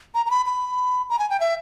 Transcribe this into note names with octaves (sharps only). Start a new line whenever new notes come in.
A#5
A#5
B5
B5
A#5
G#5
G5
E5